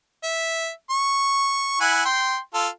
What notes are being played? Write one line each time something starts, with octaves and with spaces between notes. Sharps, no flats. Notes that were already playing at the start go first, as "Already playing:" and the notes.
E5
C#6
E4 F#5 G#5
G5 C6
F4 A4